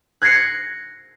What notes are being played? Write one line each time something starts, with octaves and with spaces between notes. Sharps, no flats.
F#6 G#6 A#6 C7 C#7